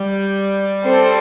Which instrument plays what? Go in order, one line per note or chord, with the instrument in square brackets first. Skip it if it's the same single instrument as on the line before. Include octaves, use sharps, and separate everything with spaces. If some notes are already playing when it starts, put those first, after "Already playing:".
Already playing: [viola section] G3
[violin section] C4 A4 C5